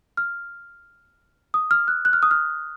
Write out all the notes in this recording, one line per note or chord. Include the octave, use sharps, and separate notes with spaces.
F6
D#6
F6
F#6
F#6
F6
D#6
F6